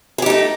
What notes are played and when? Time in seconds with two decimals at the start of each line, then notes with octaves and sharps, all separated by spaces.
0.18 G#4
0.22 G4
0.26 D#4
0.30 A3